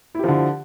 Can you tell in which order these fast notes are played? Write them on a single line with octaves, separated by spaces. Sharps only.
E4 G4 F3 D3